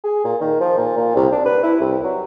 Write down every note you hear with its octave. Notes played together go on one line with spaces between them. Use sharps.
G#4
A#2
D#3
F3
A#2
A#2
C2
D4
B4
E4
C2
F#3